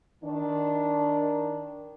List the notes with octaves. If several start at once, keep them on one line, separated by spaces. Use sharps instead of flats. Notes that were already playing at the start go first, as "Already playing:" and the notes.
D#3 D4